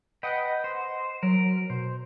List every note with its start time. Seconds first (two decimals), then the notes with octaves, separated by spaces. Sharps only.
0.23 B4 D#5 F#5 G5
0.64 C5
1.23 F#3 A#4
1.70 B2 C5